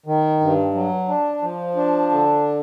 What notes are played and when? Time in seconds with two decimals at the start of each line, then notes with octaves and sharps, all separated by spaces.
0.06 D#3
0.40 G2
0.74 F#3
1.08 D4
1.42 F3
1.76 D4
2.11 D3